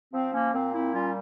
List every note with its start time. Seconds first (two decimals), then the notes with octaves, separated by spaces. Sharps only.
0.12 F3 C4
0.32 A#3 C#4
0.53 A#2 C4
0.73 C4 E4
0.93 G3 C#4 F4